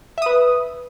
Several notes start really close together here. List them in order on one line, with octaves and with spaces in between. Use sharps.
E5 D#6 B4